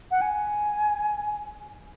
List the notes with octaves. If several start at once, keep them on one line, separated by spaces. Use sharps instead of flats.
F#5
G#5